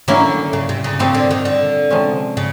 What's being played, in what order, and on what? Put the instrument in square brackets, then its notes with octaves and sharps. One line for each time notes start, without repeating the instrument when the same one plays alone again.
[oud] D3 [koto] F#3 A#3 C#4 E4
[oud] C#3
C3
C#3
[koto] A#2 G3 C4 [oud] C#3
[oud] D3
D#3
D3
[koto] C3 F3 G#3 C#4
[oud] C#3